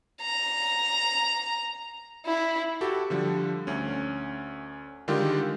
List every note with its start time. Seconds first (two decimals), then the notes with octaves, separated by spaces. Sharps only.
0.22 A#5
2.26 E4
2.81 F#4 G4 A4
3.10 D3 F3 G3
3.67 D2 C#4
5.08 D3 D#3 G3 G#3 F4 G4